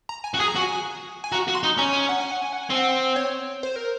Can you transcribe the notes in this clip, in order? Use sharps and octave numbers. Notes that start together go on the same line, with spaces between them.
A#5
G#5
F#4
G#4 G#5
A#5
F#4 G#5
G#5
F#4 A#5
F#4
C6
D#4
C#4 A#5
G#5
F#5
G#5
F#5
G#5
F#5
G#5
C4
F#5
C#5
C5
A#4